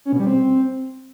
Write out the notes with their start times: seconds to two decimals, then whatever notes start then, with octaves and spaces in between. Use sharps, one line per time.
0.05 C#4
0.13 B2
0.20 G3
0.27 C4